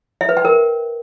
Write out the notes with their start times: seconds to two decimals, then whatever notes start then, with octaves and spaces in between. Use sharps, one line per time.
0.21 E5
0.29 B4
0.37 G5
0.45 A#4